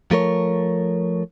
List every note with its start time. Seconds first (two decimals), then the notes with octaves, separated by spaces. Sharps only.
0.11 F3 A3 A#4 C#5